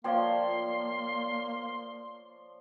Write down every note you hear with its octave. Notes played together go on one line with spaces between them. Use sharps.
F3 A#3 C#5 D5 F5 G5 C6